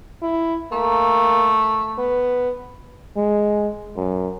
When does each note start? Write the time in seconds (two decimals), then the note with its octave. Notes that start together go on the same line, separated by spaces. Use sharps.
0.22 E4
0.72 A3 A#3
1.98 B3
3.16 G#3
3.97 F#2